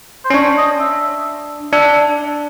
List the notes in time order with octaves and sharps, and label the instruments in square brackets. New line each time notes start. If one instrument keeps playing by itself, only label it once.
[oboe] C5
[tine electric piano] C#4
[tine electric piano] D4 [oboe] C#5
[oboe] D#5
E5
[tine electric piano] D4 [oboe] E5